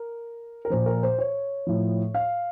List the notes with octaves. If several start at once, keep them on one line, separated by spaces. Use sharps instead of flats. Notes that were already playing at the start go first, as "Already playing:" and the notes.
Already playing: A#4
A#4
A#2 F3 C5
A#4
C5
C#5
A2 F3
F5